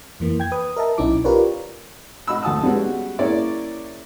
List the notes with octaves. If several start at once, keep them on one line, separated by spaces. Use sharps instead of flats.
F2 E3 A#3
G5 G#6
B4 D#6
A#4 D#5 E5 A5
B1 C#4 D#4 E4 D6
F4 G4 A#4 B4 C#5 D5
F#4 D#5 B5 E6
D2 F#4 A5 D#6 E6
G3 G#3 B3 C#4 F#4 B4
A#3 C#4 E4 G#4 C#5 D5